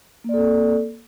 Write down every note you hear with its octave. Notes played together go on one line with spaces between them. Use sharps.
A#3 C4 A4 D5